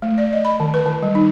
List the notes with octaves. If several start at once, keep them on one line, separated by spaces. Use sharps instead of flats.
A3
D5
D#5
B5
D#3
B4
D#3
G3
D#4